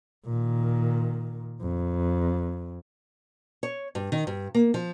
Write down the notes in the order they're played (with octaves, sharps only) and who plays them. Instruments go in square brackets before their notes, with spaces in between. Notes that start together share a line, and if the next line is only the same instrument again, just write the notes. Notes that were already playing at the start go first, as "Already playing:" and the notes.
[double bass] A#2 D#3
F2
[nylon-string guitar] C#5
G2
D#3
G2
A#3
F3